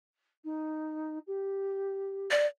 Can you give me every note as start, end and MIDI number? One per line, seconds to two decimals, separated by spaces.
0.44 1.18 63
1.27 2.29 67
2.31 2.46 74